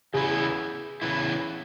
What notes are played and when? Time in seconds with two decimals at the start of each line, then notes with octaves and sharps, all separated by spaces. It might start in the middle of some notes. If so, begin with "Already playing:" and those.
0.14 C#3 E3 B3 E4 G#4
1.02 C#3 E3 B3 E4